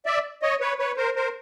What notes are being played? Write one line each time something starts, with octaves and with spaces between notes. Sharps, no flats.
D5 E5
C#5 D#5
B4 C#5
B4 C#5
A#4 C5
A#4 C5